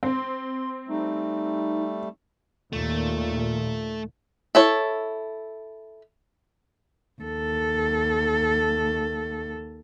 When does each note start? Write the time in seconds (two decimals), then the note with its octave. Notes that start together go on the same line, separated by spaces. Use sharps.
0.03 C4 C6
0.88 G3 A3 D#4
2.73 D#2 A#2 A3
4.55 E4 A4 C#5
7.22 D#2 A4